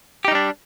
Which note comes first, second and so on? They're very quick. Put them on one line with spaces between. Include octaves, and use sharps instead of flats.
G4 D#4 G3 D4